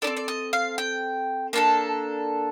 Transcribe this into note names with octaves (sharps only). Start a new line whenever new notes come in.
D#4 A4 D5
C4
D5
D#5
F5
G5
A#3 D4 A4 A5